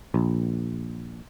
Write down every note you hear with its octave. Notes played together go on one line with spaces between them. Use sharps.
A#1